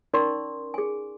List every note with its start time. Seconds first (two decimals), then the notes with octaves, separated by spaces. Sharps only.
0.14 C#4 D#4 A#4 D5 C6 C#6
0.74 G#4 G#5